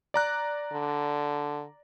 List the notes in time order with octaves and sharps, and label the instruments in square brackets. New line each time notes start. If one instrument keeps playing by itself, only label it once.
[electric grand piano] D5 A#5 F#6
[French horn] D3